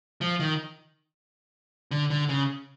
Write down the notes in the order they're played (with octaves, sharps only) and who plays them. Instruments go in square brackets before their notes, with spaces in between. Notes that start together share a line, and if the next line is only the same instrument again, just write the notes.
[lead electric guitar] F3
D#3
D3
D3
C#3